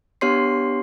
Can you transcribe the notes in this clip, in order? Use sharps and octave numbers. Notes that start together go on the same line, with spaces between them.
B3 D4 G4 C#5 C6 C7